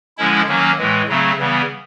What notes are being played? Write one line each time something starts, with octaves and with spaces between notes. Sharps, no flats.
D3 F3 G#3 C#4 E4
D#3 F#3 A#3 C#4
A2 E3 G#3
C#3 F#3 A3 C4
C#3 E3 G3 B3